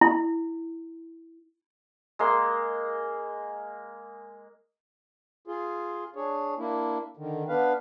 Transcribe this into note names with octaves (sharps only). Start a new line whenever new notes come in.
E4
G#3 A#3 A#4 C6
F4 G#4
D4 G#4 C#5
A#3 D4 E4
D3 D#3
B3 D4 B4 F5